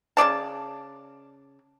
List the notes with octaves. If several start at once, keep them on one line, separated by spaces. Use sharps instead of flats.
C#3 D4 D5 A5